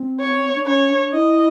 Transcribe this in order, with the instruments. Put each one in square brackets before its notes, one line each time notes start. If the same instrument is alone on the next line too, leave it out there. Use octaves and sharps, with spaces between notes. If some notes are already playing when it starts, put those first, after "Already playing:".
Already playing: [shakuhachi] C4
[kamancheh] C#5
[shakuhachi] D4
[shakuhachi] C#4 [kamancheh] C#5
[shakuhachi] D4
[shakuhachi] E4 [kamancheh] D#5